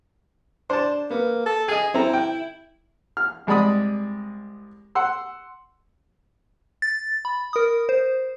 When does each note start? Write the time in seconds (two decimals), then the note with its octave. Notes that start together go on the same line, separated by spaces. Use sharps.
0.70 D4 C5 A5
1.11 A#3 B3
1.46 A4
1.68 G#4 D#5 G#5
1.94 C4 E4 A4 A#5
2.13 G5
3.17 F6
3.47 C2 G#3 D5 B5 D#6
4.95 F#5 C6 E6
6.82 A6
7.25 B5
7.53 A#4 D#6
7.89 C5